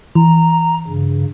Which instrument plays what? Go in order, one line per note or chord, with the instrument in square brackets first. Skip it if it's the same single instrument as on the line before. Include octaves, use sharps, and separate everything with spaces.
[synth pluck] E3 [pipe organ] A#5
[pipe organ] G2 C#3